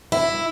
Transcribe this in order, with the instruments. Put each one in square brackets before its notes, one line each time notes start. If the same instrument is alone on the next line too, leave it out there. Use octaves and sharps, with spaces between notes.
[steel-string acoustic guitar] E4